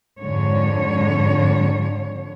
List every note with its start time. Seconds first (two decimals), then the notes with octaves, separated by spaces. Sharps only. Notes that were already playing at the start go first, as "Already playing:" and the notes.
0.19 F2 G#2 D3 C#5